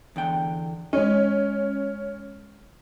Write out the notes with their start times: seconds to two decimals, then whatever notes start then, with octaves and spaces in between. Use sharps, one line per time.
0.16 E2 D3 G5
0.93 G#3 C#4 D#5